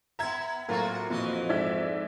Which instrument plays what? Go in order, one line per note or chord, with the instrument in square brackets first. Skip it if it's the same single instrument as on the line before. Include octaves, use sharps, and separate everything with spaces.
[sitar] B3 E5 [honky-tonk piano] A#5 G#6
[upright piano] A2 F#3 [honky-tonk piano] A#3 [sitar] C4 F4 F#4
[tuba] F2 [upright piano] A#2 [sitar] E3 F#4 D#5
[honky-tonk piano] G#2 D5 E5 [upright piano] G#6